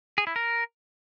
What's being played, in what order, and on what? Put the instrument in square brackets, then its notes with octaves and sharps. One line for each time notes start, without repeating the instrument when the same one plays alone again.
[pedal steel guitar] G#4
E4
A#4